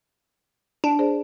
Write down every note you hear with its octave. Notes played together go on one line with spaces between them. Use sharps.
D4
G#4 C5 D5